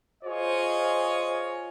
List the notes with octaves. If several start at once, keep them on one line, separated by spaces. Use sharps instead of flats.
F4 G#4 C5 C#5 D#5